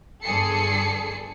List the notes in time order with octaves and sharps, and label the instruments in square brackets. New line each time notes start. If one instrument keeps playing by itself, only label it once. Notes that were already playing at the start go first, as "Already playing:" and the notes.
[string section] G1 G2 G#4 A4 C7 C#7